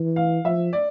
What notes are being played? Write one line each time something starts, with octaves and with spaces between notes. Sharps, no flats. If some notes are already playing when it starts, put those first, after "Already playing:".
Already playing: E3
F5
F3 E5
D5